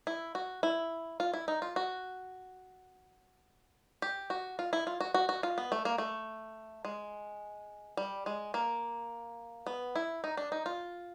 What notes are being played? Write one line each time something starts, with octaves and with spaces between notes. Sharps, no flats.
E4
F#4
E4
F4
E4
D#4
F4
F#4
G4
F#4
F4
E4
F4
F#4
F#4
F#4
F4
B3
A3
A#3
A3
G#3
G3
G#3
A#3
B3
E4
D#4
D4
D#4
F4